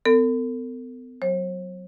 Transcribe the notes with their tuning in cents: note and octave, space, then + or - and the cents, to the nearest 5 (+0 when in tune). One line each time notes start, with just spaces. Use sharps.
B3 +40 A4 +45
F#3 +0 C5 +45